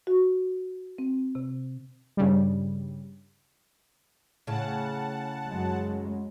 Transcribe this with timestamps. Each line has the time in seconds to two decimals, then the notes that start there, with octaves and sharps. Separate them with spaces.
0.07 F#4
0.98 C4
1.35 C3
2.17 G2 C#3 G3
4.47 A2 C#3 F#5 A5
5.48 F#2 F#3 G#3